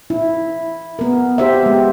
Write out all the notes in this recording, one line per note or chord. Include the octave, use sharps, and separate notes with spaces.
E4
B3 A#4
G4 C5 E5
G#3 B3